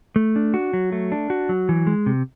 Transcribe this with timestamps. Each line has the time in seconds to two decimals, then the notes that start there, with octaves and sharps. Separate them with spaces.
0.16 A3
0.36 D4
0.54 F#4
0.73 F#3
0.92 A3
1.12 D4
1.30 F#4
1.49 F#3
1.69 E3
1.87 G#3
2.06 C3